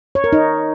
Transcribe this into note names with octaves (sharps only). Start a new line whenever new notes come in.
C#5
A#4
D#4